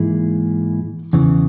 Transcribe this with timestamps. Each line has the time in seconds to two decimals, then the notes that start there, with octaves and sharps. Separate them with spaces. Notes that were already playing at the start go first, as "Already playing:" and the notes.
Already playing: G#2 E3 A#3 E4 G#4
1.13 E2 C#3 E3